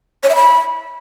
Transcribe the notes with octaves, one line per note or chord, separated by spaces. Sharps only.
C#5
E5
B5